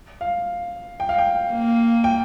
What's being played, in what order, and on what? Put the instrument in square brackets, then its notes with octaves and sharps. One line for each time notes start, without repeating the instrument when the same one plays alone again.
[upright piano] F5
G5
F5
G5
[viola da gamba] A#3
[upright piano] G5